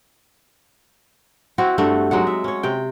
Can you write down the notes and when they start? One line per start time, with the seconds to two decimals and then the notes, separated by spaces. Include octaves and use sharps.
1.58 C4 E4 F#4
1.78 G2 A3 F#4
2.11 F#3 G#3 D#4 F#5
2.27 E5
2.44 C#4 C#5
2.63 C3 G5